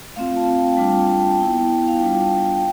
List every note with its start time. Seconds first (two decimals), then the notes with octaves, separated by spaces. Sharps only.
0.16 A3 C4 F4 F5
0.36 A5
0.58 G5
0.67 A5
0.77 G3 D4 F4 G5
0.88 A5
0.99 G5
1.09 A5
1.20 G5
1.29 A5
1.39 B3 E4 G5
1.88 F5
1.99 G3 D4 F4 G5
2.19 A5
2.40 G5
2.56 G5